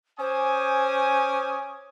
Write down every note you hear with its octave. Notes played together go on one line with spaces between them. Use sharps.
C#4 C5 G#5 D6 D#6